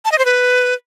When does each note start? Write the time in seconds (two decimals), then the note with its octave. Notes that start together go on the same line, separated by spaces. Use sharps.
0.05 A5
0.12 D#5
0.19 C5
0.25 B4